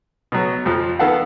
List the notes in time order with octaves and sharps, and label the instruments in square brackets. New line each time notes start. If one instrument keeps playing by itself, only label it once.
[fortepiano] B2 F#3
F2 F3
D#3 B3 A4 F5 F#5